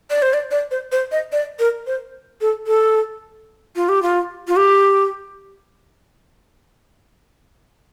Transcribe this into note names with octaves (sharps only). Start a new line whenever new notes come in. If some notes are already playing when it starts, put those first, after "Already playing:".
D5
C5
D5
D5
C5
C5
D#5
D5
A#4
C5
A4
A4
F4
G4
F4
F4
G4